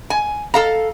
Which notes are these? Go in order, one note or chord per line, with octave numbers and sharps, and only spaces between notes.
G#5
A4 F5 A#5